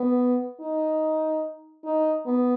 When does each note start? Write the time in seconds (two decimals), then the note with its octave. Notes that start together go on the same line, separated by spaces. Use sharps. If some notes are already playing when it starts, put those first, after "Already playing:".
Already playing: B3
0.61 D#4
1.85 D#4
2.26 B3